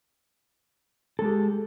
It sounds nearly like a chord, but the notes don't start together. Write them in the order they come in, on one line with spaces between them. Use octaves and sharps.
A4 G#3 G4